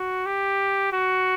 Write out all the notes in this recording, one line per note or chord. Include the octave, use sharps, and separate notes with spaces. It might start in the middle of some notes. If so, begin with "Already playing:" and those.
Already playing: F#4
G4
F#4